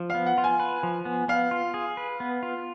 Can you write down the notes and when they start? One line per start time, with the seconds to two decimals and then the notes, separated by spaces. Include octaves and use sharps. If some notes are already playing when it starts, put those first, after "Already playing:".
Already playing: F3
0.10 B3 F5
0.26 F#5
0.38 F4
0.44 G#5
0.60 B4
0.83 F3
1.05 B3
1.28 B3 F5
1.51 F4
1.74 G#4
1.97 B4
2.20 B3
2.43 F4